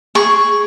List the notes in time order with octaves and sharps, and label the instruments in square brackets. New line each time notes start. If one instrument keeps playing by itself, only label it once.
[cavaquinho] G#4 C#6